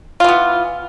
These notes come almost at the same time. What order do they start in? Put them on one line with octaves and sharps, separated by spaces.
F4 E3 B3